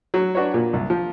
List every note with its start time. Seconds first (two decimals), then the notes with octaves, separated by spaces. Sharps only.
0.14 F#3
0.35 D4 F#4 B4 C#5
0.54 A#2
0.73 C2
0.90 F3